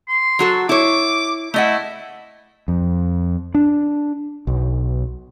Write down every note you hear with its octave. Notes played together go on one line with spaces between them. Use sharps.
C6
F#3 F#4 A4
E4 C#5 D6
A3 E4 D#5 F#5
F2
D4
B1